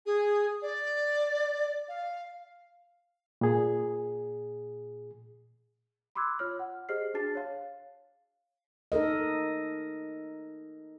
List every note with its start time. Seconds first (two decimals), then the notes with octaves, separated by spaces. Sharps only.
0.06 G#4
0.62 D5
1.89 F5
3.41 A#2 G#4
6.15 B5 C6 D6 E6 F#6 G#6
6.39 F4 C#5 F6
6.59 F#5
6.89 G4 G#4 C5 D#5 F6 C7
7.14 D4 F#4 G#4 A5 A6 C7
7.35 C#5 F5
8.92 D#4 A4 A#4 D#5